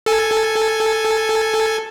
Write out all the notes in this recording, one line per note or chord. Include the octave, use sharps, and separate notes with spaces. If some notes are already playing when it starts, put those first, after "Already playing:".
A4 G#5